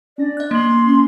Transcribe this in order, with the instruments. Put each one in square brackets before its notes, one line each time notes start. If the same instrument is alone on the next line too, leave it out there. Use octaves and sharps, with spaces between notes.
[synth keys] C#4 D4 A#6 [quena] D5
[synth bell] D#5 F#6
[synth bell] A#3 F#7 [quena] C6
[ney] C#4